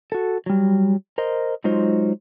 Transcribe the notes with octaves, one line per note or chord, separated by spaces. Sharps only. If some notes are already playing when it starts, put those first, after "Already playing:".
F#4 A4
F#3 G3
A#4 C5 D#5
F#3 G#3 D#4 F4 C5